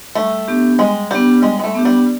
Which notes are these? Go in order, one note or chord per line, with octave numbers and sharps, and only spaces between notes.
G3 A3
B3 D4 G4
G3 G#3
G3 B3 D4 G4
G3 G#3
G#3
A3
B3 D4 G4
G3